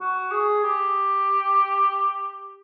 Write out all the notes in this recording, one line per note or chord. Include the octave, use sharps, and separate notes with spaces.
F#4
G#4
G4